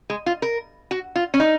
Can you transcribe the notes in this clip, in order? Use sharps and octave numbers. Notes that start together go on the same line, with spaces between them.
G#3
F4
A#4
F#4
F4
C#4
D#4